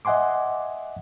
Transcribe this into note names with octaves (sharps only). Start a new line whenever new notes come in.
D#5 E5 F#5 G#5 C6 D6